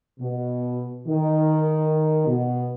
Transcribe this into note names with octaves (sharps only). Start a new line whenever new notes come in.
B2
D#3
B2